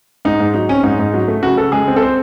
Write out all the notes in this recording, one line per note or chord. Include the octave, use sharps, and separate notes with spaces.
G#2 D#4
G#2
F#3 D#4
C4 C#4
G#2 D#4
G#2
F#3
A3
C#3 F#4
C#3 A4
G#3 G#4
C4
A4
C5